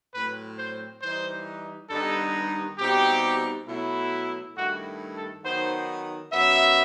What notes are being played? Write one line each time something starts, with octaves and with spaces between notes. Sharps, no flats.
A2 F#3 C4 B4
C5
E3 G3 D#4 C5
G2 D#3 G3 B3 D#4 A4
B2 G3 C4 D#4 G4
B2 F#3 A3 E4
G2 D#3 A3 E4 F#4
A4
D#3 F#3 B3 D#4 C5
F#2 F#3 B3 E5